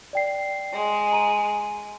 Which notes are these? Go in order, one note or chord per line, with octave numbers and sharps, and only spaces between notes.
D5 G5 C7
G#3
A#5 D#7